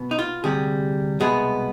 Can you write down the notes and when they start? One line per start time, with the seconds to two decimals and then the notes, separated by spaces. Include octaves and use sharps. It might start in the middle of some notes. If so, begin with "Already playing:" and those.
Already playing: B2 B3
0.11 D#4
0.19 F4
0.44 D2 C3 G3 G#4
1.20 C2 B2 G#3 B3 G#4